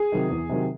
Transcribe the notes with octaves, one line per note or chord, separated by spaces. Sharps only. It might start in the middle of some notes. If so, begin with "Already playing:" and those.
Already playing: G#4
C3 D#3 F#3
E2
C3 D#3 F#3